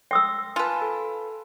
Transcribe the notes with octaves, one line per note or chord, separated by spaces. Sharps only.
G5 C6 D#6 E6 A#6
F4 B4 G#5 A5
A4